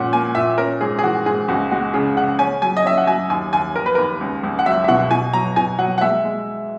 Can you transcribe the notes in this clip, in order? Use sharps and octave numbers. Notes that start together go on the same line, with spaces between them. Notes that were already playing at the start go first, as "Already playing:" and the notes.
Already playing: A#2 G#3 C#4 F#5
A#3 G#5
A#2 E5
C#4 A#4
G#2 G#4
G#4
E3 F#4
G#2 G#4
C#2 F#4
G#3 F#4
C#3 G#4
C#3 F#5
C#4 G#5
F#3 G#5
D#5
C#4 E5
F#5
F#3 G#5
D#2 G#5
D#2 G#5
D#2 A#4
B4
D#2 A#4
C#2
C#2
F#5
F#3 E5
E5
B2 F#5
B2 G#5
F#3 A#5
B2 G#5
F#3 F#5
F#5
G#3 E5
G#3